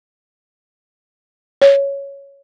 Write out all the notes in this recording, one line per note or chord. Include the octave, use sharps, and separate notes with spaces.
C#5